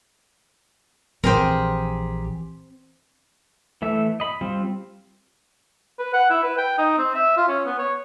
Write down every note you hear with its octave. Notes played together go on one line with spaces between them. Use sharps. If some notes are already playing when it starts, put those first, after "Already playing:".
A#1 E3 C4 G4 G#4 A#4 C5
E3 A3 E5
D#5 B5
G3 C4 F4
B4
F#5
E4
B4
G5
D#4
C4
E5
F4
C#4
B3
C#5